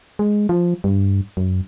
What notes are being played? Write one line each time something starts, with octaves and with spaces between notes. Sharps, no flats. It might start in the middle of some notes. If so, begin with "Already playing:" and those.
G#3
F3
G2
F#2